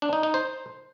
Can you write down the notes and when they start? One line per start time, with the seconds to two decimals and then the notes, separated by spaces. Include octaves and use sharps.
0.02 D4
0.13 D#4
0.23 D#4
0.34 C5